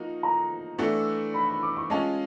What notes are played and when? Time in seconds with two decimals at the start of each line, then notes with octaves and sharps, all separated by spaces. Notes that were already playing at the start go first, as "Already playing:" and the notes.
Already playing: F3 A#3 D#4 F#4
0.23 A#5
0.78 E3 A3 D4 F#4 A4
1.34 B5
1.49 B5
1.63 D6
1.77 C#6
1.90 G#3 C#4 F4 A5